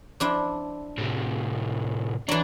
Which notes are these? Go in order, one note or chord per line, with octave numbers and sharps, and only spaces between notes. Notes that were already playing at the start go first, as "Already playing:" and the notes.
F3 D4 E4
A2 C3
E3 F#3 D4